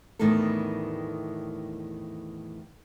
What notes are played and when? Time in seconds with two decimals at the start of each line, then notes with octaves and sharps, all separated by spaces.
0.19 E2 A2 D#3 E3 G3 A4